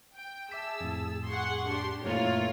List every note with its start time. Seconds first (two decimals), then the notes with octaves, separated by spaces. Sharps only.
0.15 G5
0.52 G#4 E5 A5 D6 E6 B6
0.81 F2 A2
1.26 G#4 F#5 C6 C#6
1.67 D4 G4 C6
2.04 F#2 A#2 E3 A3 A#3 F4 A#4 C#5